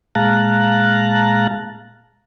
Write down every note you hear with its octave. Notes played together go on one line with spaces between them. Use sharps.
A#2 G#3 F5 A5 A#5 F#6